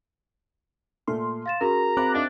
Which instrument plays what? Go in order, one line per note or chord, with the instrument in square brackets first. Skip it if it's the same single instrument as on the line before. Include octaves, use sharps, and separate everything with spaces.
[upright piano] A#2 A3 F6 [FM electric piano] C6
[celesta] F5 A6 E7
[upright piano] C#4 [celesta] F#4 G#4 A#4 [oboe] A#5
[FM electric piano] C4 D6 F#6 [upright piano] F5 B5
[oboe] D4 [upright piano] D#4 E5 F5